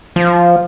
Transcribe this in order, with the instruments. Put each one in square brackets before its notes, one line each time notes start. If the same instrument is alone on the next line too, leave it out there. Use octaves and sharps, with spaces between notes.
[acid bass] F3